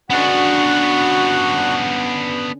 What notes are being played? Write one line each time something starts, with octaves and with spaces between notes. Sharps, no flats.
D3 B3 C#4 D4 F#4 F#5